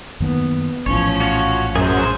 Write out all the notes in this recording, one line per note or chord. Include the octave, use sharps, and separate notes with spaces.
F#2 D#3 A#3 B3
A#1 A2 E3 F3 C#4 C#5
F#4 C#5 F5
F#2 G#4 C5